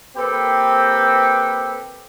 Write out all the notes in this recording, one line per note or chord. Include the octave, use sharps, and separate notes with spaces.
A#3 C4 G4 A4 B4 G5